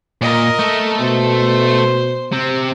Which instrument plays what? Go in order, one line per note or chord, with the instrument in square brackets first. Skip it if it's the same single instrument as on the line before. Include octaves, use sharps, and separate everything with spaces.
[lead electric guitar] A#2 [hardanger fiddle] A#4 D#5
[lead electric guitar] A3 A4
[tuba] B2 [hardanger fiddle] C5
[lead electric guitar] C3 C4